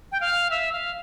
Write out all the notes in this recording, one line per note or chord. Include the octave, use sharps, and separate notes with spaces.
G5
F5
E5
F5